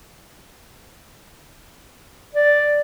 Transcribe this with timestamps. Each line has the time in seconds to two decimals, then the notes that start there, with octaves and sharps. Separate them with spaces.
2.34 D5